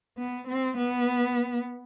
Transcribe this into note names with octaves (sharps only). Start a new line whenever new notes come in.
B3
C4
B3